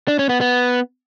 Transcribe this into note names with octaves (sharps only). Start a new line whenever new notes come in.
D4
C#4
B3
B3